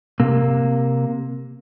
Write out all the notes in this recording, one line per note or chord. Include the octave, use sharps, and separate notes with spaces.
C3 A#3